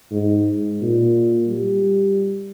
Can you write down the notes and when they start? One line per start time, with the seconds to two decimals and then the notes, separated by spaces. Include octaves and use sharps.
0.12 G#2
0.82 A#2
1.48 G3